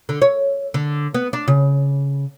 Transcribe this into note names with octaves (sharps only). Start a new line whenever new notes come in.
D3
C#5
D3
B3
D4
C#3